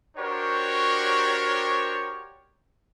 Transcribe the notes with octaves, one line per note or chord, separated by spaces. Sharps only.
D4 F#4 G4 A#4 C5 C#5